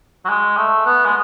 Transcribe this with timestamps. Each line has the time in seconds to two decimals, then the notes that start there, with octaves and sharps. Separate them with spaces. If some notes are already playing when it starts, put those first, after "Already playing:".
0.25 F#3
0.29 G#3
0.57 A3
0.86 B3
1.05 G#3